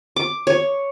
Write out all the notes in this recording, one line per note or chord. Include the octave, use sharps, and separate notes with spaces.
D6
C#5